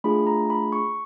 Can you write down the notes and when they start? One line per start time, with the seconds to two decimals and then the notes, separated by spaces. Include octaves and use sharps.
0.04 A3 D4 F4 G#4 B5
0.27 A#5
0.50 B5
0.72 C#6